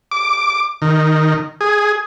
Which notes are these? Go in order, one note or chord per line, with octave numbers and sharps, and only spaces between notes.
D6
D#3
G#4